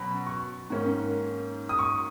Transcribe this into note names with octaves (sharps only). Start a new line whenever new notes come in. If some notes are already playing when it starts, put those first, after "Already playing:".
Already playing: B2 F#3 C#4 B5
C#6
G#2 D#3 A#3 C#4
D#6
C#6